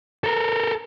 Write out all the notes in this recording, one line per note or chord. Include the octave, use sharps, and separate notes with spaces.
A4 A#4